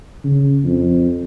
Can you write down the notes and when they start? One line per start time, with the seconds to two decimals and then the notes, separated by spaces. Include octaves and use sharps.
0.24 C#3
0.65 F2